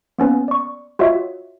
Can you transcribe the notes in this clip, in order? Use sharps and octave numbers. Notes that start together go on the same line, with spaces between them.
A#3 B3 C#4 B4
D5 C#6
F4 F#4 C#5 D#5 E5